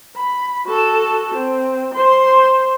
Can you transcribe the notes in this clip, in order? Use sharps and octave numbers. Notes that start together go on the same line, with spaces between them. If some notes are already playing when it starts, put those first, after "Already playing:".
B5
F#4 A4
C4
C5 C6